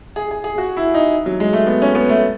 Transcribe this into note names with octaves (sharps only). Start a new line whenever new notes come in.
G#4
G#4
G#4
F#4
E4
D#4
F#3
G#3
A3
B3
C#4
B3
A3